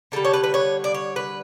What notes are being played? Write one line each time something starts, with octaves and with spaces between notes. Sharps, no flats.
D3 G3 A4
C#5
B4
B4
C#5
D5
C#5
B4